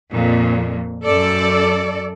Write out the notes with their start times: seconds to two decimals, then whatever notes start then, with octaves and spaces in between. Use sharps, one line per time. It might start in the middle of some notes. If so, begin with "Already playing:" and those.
0.11 F2 A#2
1.04 F#2 A4 D5